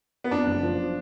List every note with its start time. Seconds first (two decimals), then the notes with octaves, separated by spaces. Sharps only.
0.24 B3
0.31 F2 D4
0.47 F#1
0.63 F3